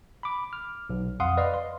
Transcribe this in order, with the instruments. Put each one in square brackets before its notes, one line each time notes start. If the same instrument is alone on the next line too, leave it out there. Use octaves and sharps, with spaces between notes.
[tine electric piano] B5 D6
F6
B1
F2 F5 F#5 C6 D#6
B4 D5 D#5 F5
C6